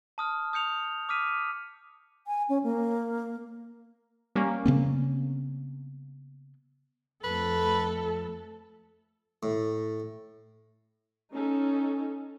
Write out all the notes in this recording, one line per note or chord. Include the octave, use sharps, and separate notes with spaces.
A5 D#6 F6
D#6 G6 C#7 F7
D6 D#6 F6 B6 D#7
G#5
C#4
A#3
G3 A#3 C#4
C#3 B3 C4
F2 A3 A4 B4
A2
C#4 D#4 A4